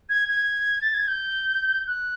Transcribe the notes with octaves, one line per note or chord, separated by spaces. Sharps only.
G#6
G#6
A6
G#6
G6
F#6